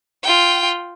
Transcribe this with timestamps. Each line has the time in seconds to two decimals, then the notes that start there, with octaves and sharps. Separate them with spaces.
0.23 F4 G5